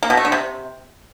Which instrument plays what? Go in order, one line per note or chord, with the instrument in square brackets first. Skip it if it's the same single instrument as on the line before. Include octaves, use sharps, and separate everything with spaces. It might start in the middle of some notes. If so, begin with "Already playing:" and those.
[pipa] A#3
B2
A3
D3
C3